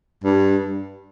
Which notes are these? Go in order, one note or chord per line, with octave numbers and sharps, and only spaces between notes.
G2